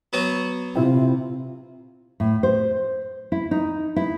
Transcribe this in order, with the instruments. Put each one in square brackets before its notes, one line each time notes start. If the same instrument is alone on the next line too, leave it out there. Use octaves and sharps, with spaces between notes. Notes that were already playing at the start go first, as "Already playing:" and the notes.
[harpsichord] F#3 B3 F#4
[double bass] C3 [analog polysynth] C4 E4 F4
[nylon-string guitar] A2
C5
E4
D#4
E4